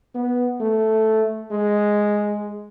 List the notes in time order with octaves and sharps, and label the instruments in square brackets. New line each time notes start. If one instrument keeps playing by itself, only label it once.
[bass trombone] B3
A3
G#3